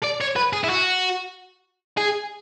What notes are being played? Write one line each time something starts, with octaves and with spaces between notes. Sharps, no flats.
D5
C#5
B4
G#4
E4
F#4
G#4